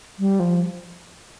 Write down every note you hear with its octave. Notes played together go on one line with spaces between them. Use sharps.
G3
F3